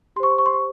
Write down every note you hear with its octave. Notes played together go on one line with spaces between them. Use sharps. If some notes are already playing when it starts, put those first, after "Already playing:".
G4 C5 C6 C#6
C6
C#6
C6
C#6